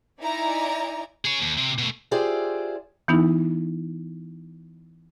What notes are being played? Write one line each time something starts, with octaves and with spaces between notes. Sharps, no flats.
D#4 E4 D5 G#5 A#5
G#4 C#5
D#2
C3 C4
B2 A3
F4 G4 G#4 C5 D5 E5
E3 B3 D#4 E4